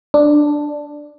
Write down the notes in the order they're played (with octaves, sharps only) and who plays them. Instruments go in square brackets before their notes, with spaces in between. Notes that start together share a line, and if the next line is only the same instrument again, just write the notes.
[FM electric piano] D4